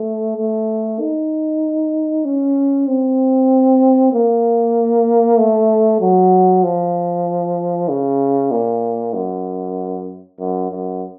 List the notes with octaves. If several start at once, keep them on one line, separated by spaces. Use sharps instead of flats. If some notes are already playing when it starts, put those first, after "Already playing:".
Already playing: A3
A3
D#4
C#4
C4
A#3
A3
F#3
F3
C#3
A#2
F#2
F#2
F#2